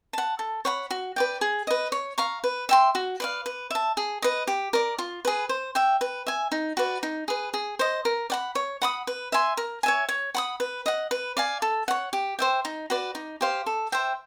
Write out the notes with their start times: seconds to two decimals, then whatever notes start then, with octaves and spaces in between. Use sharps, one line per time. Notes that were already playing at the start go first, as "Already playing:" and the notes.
0.13 F#5 A5
0.39 A4
0.65 C#5 F#5 B5
0.91 F#4
1.16 B4 D5 G5
1.41 G#4
1.67 B4 D#5
1.92 C#5
2.18 F5 A#5 C#6
2.44 B4
2.69 E5 G5 C6
2.95 F#4
3.20 B4 D5 F5
3.46 B4
3.71 E5 A5
3.97 G#4
4.22 B4 D#5
4.47 G4
4.73 A#4 D5
4.99 F4
5.25 G#4 B4
5.49 C5
5.75 E5 G5
6.01 B4
6.27 E5 G#5
6.52 D#4
6.77 F#4 B4 D5
7.03 D#4
7.28 G#4 B4
7.54 G#4
7.79 C5 D#5
8.05 A#4
8.30 D5 F#5 B5
8.55 C#5
8.82 F#5 B5 D#6
9.07 B4
9.32 E5 G#5 C6
9.57 A#4
9.83 C#5 E5 G#5
10.09 C#5
10.35 F#5 B5 D#6
10.60 B4
10.86 D#5 F#5
11.11 B4
11.37 D5 F5 G#5
11.62 A4
11.88 C#5 F#5
12.13 G4
12.39 C5 E5 G5
12.65 D#4
12.90 F#4 B4 D5
13.15 D#4
13.41 G4 C5 F5
13.66 A4
13.92 C5 E5 G5